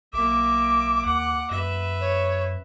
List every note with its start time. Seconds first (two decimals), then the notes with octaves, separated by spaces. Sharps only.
0.13 B1 A#3 E5 D6
1.05 D#2 F#5
1.51 F#2 B4 E5
2.01 C#5